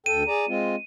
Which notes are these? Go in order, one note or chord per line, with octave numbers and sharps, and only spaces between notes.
D2 A4 G5 D#7
G#4 D5 A#5
G#3 C4 F4